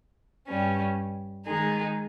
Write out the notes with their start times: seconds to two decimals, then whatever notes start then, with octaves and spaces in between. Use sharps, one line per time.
0.48 G2 G3 C#4
1.47 D#3 G#3 D#4 G#4